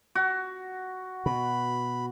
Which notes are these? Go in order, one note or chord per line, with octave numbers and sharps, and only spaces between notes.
F#4
B2 B5